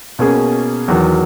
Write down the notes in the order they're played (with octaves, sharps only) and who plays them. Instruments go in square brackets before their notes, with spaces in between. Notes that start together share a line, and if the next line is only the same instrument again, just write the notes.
[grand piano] B2 A#3 C#4 G#4
E2 D#3 F#3